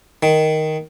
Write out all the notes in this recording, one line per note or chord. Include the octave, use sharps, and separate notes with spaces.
D#3